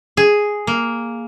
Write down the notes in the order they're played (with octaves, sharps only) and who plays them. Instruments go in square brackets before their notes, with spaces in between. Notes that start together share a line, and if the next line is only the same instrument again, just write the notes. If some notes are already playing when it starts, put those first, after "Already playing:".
[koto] G#4
A#3